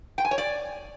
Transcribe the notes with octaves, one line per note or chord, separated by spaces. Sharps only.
G5
G#5
C#5
D5